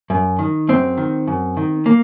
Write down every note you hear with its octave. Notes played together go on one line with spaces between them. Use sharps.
F#2
D#3
F#2 C4
D#3
F#2
D#3
A#3